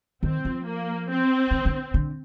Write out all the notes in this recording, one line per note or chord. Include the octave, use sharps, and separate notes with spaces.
D#3 C4
F3
A#3
C4
D#3
D3
D3